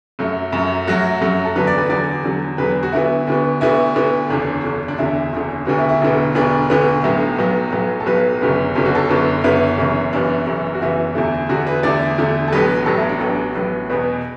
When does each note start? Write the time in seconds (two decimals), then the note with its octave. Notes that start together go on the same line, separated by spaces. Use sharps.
0.19 F#2 F#3 A3
0.52 F#2 F#3 A3
0.87 F#2 F#3 A3 F#4
1.21 F#2 F#3 A3
1.45 A4
1.56 E2 D3 F#3 B4
1.67 D5
1.78 B4
1.89 E2 D3 F#3 D5
2.24 E2 D3 F#3
2.58 E2 D3 F#3 B4
2.83 F#4
2.93 D2 D3 B3 E4
3.27 D2 D3 B3
3.61 D2 D3 B3 E4
3.96 D2 D3 B3
4.30 F#1 E2 D3 D4
4.64 F#1 E2 D3
4.88 D4
4.98 F#1 E2 D3 E4
5.32 F#1 E2 D3
5.67 E1 D2 D3 B3 F#4
5.78 E4
5.89 E4
6.02 E1 D2 D3 B3
6.35 E1 D2 D3 B3 D4
6.70 E1 D2 D3 B3
7.03 B1 A2 F#3 B3 E4
7.38 B1 A2 F#3 B3
7.72 B1 A2 F#3 B3
8.00 A4
8.06 B1 A2 F#3 B3 B4
8.41 F#1 F#2 D3 B3
8.75 F#1 F#2 D3 B3 A4
8.86 F#4
8.95 A4
9.09 F#1 F#2 D3 B3
9.43 F#1 F#2 D3 B3 E4
9.78 F#1 F#2 E3 B3
10.13 F#1 F#2 E3 B3 D4
10.46 F#1 F#2 E3 B3
10.75 F#4
10.81 F#1 F#2 E3 B3 E4
11.15 E2 D3 A3
11.49 E2 D3 A3 F#4
11.67 B4
11.83 E2 D3 A3 D5
12.18 E2 D3 A3
12.48 A4
12.52 A1 A2 F#3 B3 B4
12.86 A1 A2 F#3 B3 A4
12.97 E4
13.09 D4
13.20 A1 A2 F#3 B3 D4
13.55 A1 A2 F#3 B3
13.90 E2 B2 B3